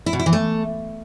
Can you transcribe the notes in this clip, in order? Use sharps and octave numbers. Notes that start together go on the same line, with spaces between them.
E4
B2
E4
E3
A3